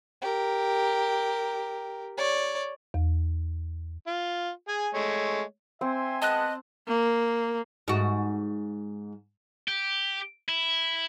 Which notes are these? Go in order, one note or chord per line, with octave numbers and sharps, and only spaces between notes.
G4 A#4
C#5 D5
E2
F4
G#4 G#5
G#3 A3 C#5
C4 E5 G#5 C6
G#3 B3 D#5 A5 F#6
A#3
G#2 F#4
G4
E4